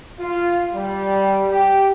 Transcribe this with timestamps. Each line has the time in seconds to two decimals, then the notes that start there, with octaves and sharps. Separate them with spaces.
0.19 F4
0.73 G3
1.50 G4